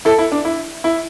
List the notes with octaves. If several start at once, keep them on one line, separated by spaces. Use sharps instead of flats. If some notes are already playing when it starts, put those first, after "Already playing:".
E4 A4
E4
D4
E4
E4